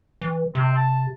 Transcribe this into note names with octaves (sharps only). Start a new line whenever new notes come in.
E3
C3 C4
A5